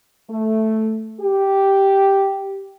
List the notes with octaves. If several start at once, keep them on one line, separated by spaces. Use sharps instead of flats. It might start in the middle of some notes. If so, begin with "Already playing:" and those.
A3
G4